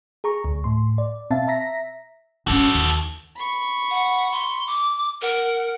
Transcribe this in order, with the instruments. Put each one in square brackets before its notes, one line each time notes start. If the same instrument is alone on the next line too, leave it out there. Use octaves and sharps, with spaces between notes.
[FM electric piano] G#4 A#5 C#6
D2
A2 C6
D5
B2 C4 E5 F5 A5 A6
E5 A#5 A#6 B6
[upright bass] G2 C#4 [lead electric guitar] F#4 A4
[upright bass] D#2
[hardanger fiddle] B5 C#6
[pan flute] F#5
C6
D6
[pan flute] A#4 [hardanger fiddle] F#5